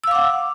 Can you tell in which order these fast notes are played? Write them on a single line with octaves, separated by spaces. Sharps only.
E6 F5 D6 F#5